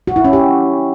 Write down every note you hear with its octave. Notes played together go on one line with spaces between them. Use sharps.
F#4
E4
C#4
G4